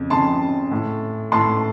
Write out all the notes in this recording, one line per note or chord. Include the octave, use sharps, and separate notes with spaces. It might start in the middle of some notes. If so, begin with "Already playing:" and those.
Already playing: F2 C#3
F2 C#3 A5 C6
A2
A2 A5 C6